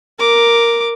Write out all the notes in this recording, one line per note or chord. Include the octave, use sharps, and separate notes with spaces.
A#4 D6